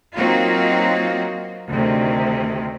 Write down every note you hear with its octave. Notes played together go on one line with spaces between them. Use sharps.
F#3 A#3 C4 D#4 F4 F#4
D2 C3 D#3